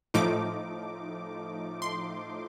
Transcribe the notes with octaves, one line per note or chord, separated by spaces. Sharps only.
A2 F3 A3 D#4 D6
C6